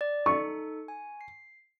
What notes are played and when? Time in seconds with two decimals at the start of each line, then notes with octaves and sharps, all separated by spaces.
0.01 D5
0.26 D#4 A4 C#6
0.88 G#5
1.21 C7